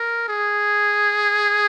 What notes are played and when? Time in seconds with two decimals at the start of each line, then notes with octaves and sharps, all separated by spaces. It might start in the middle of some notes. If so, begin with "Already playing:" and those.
Already playing: A#4
0.28 G#4